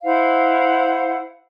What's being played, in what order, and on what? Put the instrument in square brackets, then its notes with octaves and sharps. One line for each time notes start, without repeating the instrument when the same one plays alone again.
[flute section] E4 C5 F5 F#5